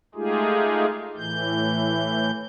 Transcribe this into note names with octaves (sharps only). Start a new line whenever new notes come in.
G#3 A3 D#4 F4 G4 G#4
A2 E3 G6